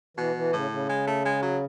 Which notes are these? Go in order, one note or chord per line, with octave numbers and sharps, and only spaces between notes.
B2 E3
E3
A2 C#3
C#3
G#3
A3
G#3
F#3